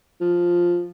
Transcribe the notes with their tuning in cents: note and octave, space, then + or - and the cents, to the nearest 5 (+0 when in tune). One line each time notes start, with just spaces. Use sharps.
F3 +0